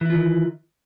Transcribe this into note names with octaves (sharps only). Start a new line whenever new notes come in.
D#3 E3 E4 F4